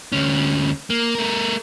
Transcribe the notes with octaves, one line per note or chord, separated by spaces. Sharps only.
D2 C#4
A#3
A3 A#4